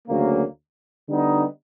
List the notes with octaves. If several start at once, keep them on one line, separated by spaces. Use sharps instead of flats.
D2 C#3 F#3 A#3
D3 G3 B3 D#4